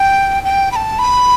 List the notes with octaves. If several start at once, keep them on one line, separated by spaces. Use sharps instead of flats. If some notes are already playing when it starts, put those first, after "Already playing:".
Already playing: G5
G5
B5
A5
B5